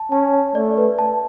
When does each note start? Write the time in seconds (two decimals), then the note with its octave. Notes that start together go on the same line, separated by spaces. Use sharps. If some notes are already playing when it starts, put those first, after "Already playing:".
Already playing: A5
0.11 C#4 A5
0.33 A5
0.55 A3 D5
0.78 B4
0.99 A5